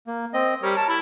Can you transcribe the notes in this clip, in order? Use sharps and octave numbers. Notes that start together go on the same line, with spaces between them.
A#3
C4 D#5
G3 A#4 C#5
A5
E4